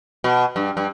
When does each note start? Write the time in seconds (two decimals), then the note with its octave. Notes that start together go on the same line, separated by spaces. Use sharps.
0.24 B2
0.56 G2
0.77 G2